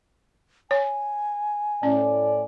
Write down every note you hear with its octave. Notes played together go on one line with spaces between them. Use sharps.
C#5 G#5
A2 C#4 D5